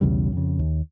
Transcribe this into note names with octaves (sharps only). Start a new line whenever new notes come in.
B1 E2 C#3 G3
F2 C#3
D#2